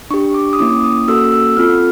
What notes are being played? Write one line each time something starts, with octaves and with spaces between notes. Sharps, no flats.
D4 G4 C#6
D6
D#6
A#3 C#4 E4 D6
D#6
A#3 C#4 F#4 A4 E6
E6
C4 F4 A4 F6